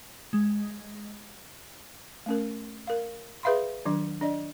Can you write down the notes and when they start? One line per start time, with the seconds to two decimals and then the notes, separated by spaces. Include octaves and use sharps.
0.33 G#3
2.26 A3 C#4 A#4
2.87 A#4 F5
3.43 G#4 B4 E5 F5 B5 C6
3.85 D#3 F#3 D4
4.21 D4 D5 D#5